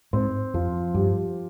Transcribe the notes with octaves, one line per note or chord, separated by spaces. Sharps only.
G#2 C4
F2 F3
G2 G4